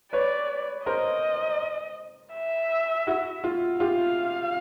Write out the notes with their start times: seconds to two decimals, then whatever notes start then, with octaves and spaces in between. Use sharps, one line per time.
0.13 B4 C#5 D5
0.86 A#4 C5 D#5
2.34 E5
3.07 E4 F#4
3.44 F4
3.80 F4 G4 F5